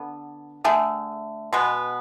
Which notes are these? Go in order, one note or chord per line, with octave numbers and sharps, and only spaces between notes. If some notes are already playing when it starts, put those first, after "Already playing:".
Already playing: D3 B3
D3 A3 G#4
B2 G#3 B3